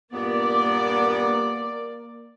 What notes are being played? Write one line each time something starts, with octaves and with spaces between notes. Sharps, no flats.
G2 A#2 A#3 B3 D5